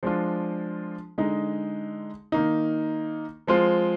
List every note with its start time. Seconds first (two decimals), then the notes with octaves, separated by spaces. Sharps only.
0.03 F3 G#3 D4 F4
1.18 D3 G#3 D#4
2.32 D#3 A#3 D#4
3.47 F3 G#3 C4 F4